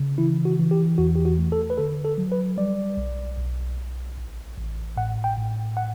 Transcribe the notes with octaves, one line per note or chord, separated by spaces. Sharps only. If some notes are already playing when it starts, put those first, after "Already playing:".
Already playing: C#3
E3 E4
F#4
E3
G4
E2 F#4
G4
F#4
A3
A4
B4
D3 A4
A4
F#3
B4
G3 D5
B1
B1
B1
A1
A1
A2 F#5
G5
A2
F#5